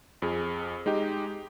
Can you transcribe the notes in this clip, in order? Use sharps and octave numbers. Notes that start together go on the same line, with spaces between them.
F2 G#4
G#3 D#4 G4